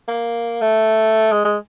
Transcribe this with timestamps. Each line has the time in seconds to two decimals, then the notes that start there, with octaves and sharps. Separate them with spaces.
0.08 A#3
0.61 A3
1.32 G#3
1.45 G#3